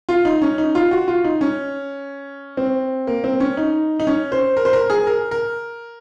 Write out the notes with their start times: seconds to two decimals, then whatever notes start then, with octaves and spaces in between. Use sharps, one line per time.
0.09 F4
0.25 D#4
0.42 C#4
0.58 D#4
0.75 F4
0.91 F#4
1.08 F4
1.24 D#4
1.41 C#4
2.57 C4
3.07 A#3
3.24 C4
3.40 C#4
3.57 D#4
4.00 D#4
4.07 C#4
4.32 C5
4.57 A#4
4.65 C5
4.73 A#4
4.90 G#4
5.07 A#4
5.31 A#4